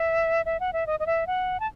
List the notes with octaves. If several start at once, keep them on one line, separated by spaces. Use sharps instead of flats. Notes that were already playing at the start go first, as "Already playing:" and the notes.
Already playing: E5
E5
F#5
E5
D#5
D#5
E5
F#5
A5